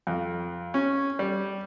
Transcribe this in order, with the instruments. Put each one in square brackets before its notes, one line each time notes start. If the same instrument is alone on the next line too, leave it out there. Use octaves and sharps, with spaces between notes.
[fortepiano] F2
C#4
G3